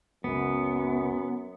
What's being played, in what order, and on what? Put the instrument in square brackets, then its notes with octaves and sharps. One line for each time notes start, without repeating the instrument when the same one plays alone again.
[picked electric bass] F#1 C#2 [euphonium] F#2 [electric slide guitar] B3